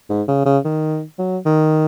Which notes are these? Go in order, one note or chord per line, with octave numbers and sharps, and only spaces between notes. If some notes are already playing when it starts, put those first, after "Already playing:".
G#2
C#3
C#3
D#3
F#3
D#3